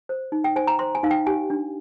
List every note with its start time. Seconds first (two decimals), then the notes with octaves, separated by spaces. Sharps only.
0.09 C5
0.32 D#4
0.44 G5
0.56 C5 G#5
0.67 A#5
0.79 C5 C6
0.95 G#5
1.03 D#4 F5
1.11 G5
1.27 G4 G#5
1.50 D4